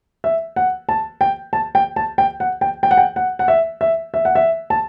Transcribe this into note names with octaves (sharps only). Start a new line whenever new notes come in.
E5
F#5
A5
G5
A5
G5
A5
G5
F#5
G5
G5
F#5
G5
F#5
F#5
E5
E5
E5
F#5
E5
A5